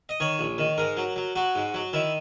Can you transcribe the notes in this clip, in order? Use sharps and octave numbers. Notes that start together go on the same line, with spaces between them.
D#5
D#3 C#5
A#1
D#3
G#2 A#4
F#3
F#3
F#3 F#4
G#2
F#3
D#3 E4